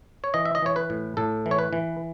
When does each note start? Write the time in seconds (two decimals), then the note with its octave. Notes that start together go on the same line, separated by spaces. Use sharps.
0.24 C#5
0.34 E3 D#5
0.45 E5
0.55 D#5
0.62 E3 C#5
0.76 B4
0.90 A2
1.17 A2 A4
1.46 E3
1.51 C#5
1.58 B4
1.73 E3